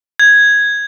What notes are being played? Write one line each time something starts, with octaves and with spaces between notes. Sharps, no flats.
G#6